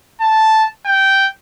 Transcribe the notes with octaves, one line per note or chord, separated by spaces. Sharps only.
A5
G5